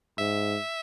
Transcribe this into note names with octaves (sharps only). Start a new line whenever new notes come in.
G#2 E5